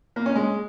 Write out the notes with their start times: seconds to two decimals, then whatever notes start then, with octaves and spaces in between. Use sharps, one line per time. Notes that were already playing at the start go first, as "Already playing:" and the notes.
0.16 A#3
0.26 C#4
0.35 G#3